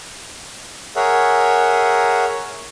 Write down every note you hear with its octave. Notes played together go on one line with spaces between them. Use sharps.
G#4 A#4 C#5 E5 F#5